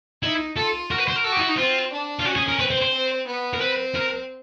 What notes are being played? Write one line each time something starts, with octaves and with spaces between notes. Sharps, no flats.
D#4 E4
F4 A4
F#4 A#4
B4
C5
A#4
F#4 A4
G4
D#4
E4
D#4
C4 F4
D4
F4
C#4 F#4
G#4
A#4
C4 B4
C5
C5
C4
B3
A#4
C4 B4
A#4